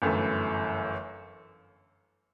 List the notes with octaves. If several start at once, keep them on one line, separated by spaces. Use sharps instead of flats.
G1 F#2 E3 A3